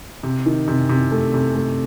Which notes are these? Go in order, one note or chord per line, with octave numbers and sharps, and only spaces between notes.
C3
D#3
C3
C3
A3
C3
A3